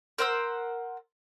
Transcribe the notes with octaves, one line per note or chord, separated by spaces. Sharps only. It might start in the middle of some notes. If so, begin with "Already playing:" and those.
A#4 C5 F#5 E6